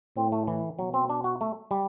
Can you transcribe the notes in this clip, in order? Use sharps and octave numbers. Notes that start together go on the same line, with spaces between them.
A2 C4
A3
E3
B2 F#3
C4
D4
F#4
A3
G3